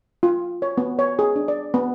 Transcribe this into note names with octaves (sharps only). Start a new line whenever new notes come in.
F4
C#5
B3
C#5
G#4
D4
D5
B3